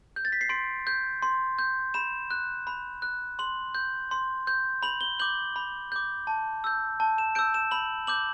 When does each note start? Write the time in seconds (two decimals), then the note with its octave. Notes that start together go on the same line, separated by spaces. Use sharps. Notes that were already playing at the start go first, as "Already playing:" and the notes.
0.16 G6
0.25 A6
0.32 B6
0.41 C7
0.49 C6 D7
0.87 G6
1.22 C6
1.59 G6
1.94 B5 E7
2.31 F#6
2.67 B5
3.02 F#6
3.39 C6 F#7
3.75 G6
4.11 C6
4.47 G6
4.83 B5 F#7
5.01 G7
5.19 D6 G6 F#7
5.56 B5
5.92 D6 G6
6.27 A5
6.64 E6 G6
7.00 A5
7.18 E7
7.35 E6 G6 D7
7.54 E7
7.71 B5 F#7
8.07 D6 G6 F#7